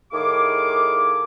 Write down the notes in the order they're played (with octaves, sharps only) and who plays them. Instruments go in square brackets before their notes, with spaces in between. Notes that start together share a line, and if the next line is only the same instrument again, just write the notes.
[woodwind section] A2 D#3 G#4 F5 D6